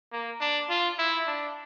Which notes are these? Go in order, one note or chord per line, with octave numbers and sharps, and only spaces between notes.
A#3
D4
F4
E4
D4